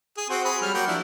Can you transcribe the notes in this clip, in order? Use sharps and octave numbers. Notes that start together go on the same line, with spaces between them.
G#4
C4 F#4 C5
G#4 B5
F#3 G3 F6
A#3 F#4 G5
F3 D4 E4